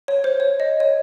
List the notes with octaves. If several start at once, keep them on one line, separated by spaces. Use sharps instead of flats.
C#5
C5
C#5
D#5
C#5